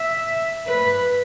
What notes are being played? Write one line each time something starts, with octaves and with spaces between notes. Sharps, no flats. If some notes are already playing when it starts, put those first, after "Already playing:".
Already playing: E5
B4